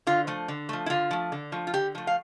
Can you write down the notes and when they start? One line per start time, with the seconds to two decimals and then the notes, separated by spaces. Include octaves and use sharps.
0.07 D3 F4
0.27 F3 A3
0.48 D3
0.69 F3 A3
0.86 E4
0.90 D3 F4
1.11 F3 A3
1.32 D3
1.52 F3 A3
1.67 F4
1.74 D3 G4
1.95 F3 A3
2.07 F5